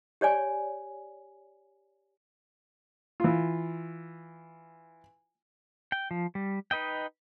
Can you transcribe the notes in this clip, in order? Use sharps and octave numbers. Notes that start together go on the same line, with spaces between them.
G4 C#5 D5 G#5
E3 F4
G5
F3
G3
D#4 B4 D#5 G5